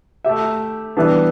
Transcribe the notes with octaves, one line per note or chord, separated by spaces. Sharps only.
A3 G4 E5
E3 G3 B3 D4